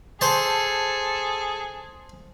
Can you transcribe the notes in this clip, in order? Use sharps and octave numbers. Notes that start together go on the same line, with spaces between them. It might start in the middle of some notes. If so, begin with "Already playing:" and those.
G#4 A4 C5 A5